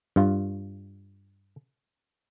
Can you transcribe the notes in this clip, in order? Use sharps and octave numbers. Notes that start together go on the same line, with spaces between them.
G2 F4